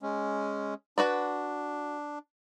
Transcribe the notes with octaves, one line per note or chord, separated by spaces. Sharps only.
G#3 C#4
D4 F#4 B4 D5